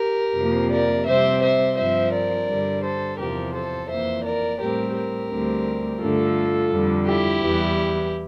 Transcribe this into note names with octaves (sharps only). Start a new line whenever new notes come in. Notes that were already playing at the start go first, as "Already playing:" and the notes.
Already playing: G4 A#4
F2 C3 F3 A#3
A#4 D5
C3 G3 C4 C5 E5
C5 E5
G2 F3 C4 C5 E5
A#4 D5
G2 D3 G3
A4 C5
E2 C3 F3 G4 A#4
A4 C5
F2 E3 A#3 C5 E5
A#4 D5
A2 G3 C4 G4 A#4
G4 A#4
D2 D3 G3 C4
G2 D3 A3 F4 A4
F2 D3 G3
E4 G4
E2 E3 G3